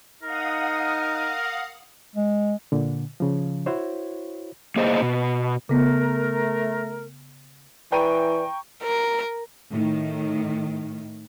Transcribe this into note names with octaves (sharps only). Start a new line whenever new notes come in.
D#4 A#4 F5 F#5 D#6
G#3
A#2 D3
C#3 F3
E4 F#4 C5 C#5
A#3 G#4 C5 D#5
B2
C#3 A3 B3 A#4
E3 B4 D5 G5 A#5 C#6 D#7
A#4
A2 D#3